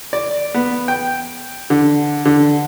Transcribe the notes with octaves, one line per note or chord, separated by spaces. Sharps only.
D5
B3
G5
D3
D3